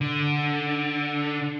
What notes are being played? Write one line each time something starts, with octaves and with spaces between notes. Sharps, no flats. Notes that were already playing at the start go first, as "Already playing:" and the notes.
D3